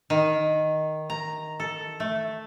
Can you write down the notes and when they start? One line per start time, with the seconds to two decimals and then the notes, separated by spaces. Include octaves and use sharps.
0.10 D#3
1.10 A#5
1.60 A4
2.00 A3